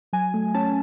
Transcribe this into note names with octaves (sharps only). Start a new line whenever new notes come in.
F#3 G#5
A3
C#4 A5